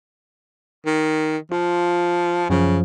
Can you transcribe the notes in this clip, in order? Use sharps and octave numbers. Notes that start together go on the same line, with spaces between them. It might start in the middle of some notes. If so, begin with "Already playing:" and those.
D#3
F3 F4
F#2 C#3 F3